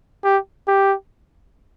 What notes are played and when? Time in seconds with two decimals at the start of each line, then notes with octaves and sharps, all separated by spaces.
0.24 G4
0.67 G4